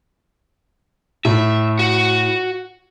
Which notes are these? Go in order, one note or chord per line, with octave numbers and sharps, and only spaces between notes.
A2 E5
F#4